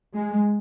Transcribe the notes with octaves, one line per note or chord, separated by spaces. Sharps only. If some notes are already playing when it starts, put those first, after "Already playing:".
G#3